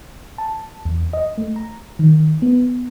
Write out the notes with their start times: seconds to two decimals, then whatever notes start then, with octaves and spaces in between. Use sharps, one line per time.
0.38 A5
0.85 E2
1.13 D#5
1.38 A3
1.56 A#5
1.99 D#3
2.42 B3